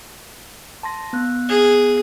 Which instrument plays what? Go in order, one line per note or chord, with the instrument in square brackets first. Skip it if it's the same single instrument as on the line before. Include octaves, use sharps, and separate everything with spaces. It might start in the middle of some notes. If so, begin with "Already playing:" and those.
[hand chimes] A5 C6 A#6
B3 F#6
[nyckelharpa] G#4